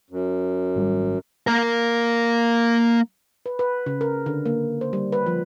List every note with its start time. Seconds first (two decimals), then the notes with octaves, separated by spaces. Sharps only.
0.10 F#2
0.76 G#1 G3
1.47 A#3 A#4
3.46 B4
3.59 B4
3.86 C#3
4.01 A#4
4.26 D3
4.46 A#3
4.81 C5
4.93 G3
5.12 B4
5.26 F3